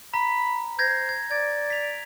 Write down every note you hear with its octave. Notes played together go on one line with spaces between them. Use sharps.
A#5 B5
C5 G6 G#6 A#6
G#6
D5 G#6
B6 F7